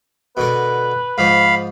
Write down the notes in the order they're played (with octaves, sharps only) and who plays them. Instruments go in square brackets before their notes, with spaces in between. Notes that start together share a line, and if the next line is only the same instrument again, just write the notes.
[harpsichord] B2 D3 A#4 [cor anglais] B4
[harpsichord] G#2 F3 [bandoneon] F5 B5